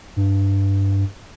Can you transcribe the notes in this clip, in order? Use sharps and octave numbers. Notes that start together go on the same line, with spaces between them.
G2